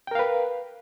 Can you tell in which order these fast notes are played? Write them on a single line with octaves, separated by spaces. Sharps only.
G5 A#4 F5 B4